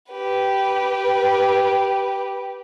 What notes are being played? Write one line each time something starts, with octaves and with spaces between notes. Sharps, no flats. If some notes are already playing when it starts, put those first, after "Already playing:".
G4 B4